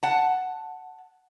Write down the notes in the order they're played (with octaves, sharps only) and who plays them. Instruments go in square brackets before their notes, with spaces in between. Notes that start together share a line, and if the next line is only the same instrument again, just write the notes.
[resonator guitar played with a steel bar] F#5 A5